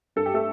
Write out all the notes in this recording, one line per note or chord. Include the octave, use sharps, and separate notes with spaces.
G2 A4
G4
A3 A4